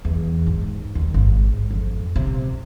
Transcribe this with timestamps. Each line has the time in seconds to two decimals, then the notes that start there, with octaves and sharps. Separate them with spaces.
0.05 E2
0.47 G#2
0.95 D#2
1.14 G#1
1.71 F2
2.16 C3